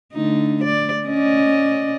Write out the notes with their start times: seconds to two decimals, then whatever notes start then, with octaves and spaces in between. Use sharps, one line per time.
0.13 D3 A3 D#4
0.64 D5
1.06 C#4 D5 D#5